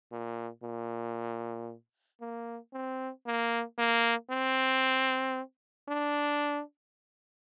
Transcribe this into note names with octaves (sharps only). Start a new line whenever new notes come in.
A#2
A#2
A#3
C4
A#3
A#3
C4
D4